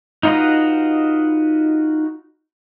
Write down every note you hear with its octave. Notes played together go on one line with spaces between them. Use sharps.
D#4 F4 F#4 B4 D#5